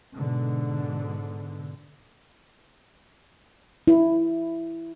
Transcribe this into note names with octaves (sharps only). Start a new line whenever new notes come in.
G#2 B2 D3
E4